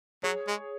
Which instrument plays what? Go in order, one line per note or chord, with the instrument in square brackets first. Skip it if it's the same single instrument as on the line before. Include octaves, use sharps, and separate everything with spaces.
[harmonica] F#3 [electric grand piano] G#4 C#5
[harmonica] G#3